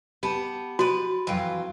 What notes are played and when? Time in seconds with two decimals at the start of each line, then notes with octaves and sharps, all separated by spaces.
0.23 B3 G4 A5
0.79 F3 F#4 B4
1.27 F2 E3 F#3 F4 G5